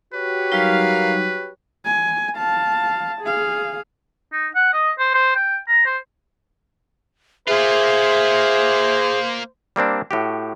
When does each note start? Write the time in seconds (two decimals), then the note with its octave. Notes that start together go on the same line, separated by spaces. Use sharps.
0.14 F#4 G4 B4 C#5
0.52 F#3 G3 D#4 A#4 F5
1.85 G#5
2.37 F5 A5
3.22 G#4 F5
4.32 D#4
4.55 F#5
4.73 D#5
4.99 C5
5.14 C5
5.36 G5
5.68 A#5
5.86 C5
7.48 A#3 F4 G#4 C5 E5
9.76 G3 A#3 C4 D4
10.11 A2 F#4 G4